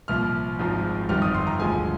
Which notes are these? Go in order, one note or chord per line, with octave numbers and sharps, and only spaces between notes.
C2 A#2 F3 F6
G#1 G#2 F3 G#3
G1 F2 D#3 G3 F6
D#6
C6
A#5
D2 D3 F3 G#3 G#5